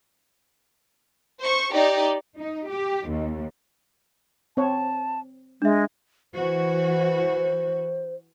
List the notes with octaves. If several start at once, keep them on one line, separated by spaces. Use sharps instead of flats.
C5 C#6
D#4 G4 D5
D#4
G4
D#2
C4 C#5 A5
G#3 D4 E5
E3 F#4 C5